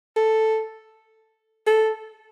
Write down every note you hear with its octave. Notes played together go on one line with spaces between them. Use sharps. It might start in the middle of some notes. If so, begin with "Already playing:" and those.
A4
A4